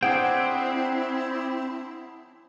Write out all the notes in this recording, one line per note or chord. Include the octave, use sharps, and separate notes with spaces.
C4 D4 E4 G#4 F#5 G5